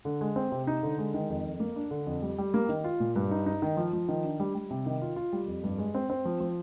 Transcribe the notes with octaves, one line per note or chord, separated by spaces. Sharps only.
D3
G#3
C4
C3
D#4
D3
G#3
D#3
F2
F2
A#3
D4
D3
F2
G3
G3
A#3
D#3
F4
A#2
G2
D#4
D#4
D#3
F3
F3
D#3
D4
G3
G3
C3
D#3
F4
F4
G3
F2
G2
G#3
C4
C4
F3
F3